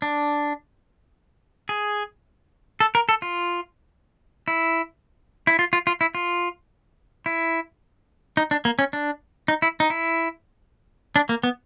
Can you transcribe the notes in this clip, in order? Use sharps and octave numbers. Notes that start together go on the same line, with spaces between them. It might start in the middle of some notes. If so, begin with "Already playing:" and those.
D4
G#4
A4
A#4
A4
F4
E4
E4
F4
F4
F4
E4
F4
E4
D#4
D4
A#3
C#4
D4
D#4
E4
D#4
E4
D4
A#3
B3